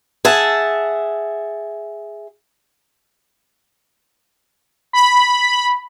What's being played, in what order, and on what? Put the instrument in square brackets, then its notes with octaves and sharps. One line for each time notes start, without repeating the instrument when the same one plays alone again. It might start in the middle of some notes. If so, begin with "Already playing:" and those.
[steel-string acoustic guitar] G#4 E5 F#5 A5
[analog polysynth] B5